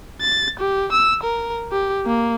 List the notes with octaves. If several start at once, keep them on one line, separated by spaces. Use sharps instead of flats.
A6
G4
E6
A#4
G4
A#3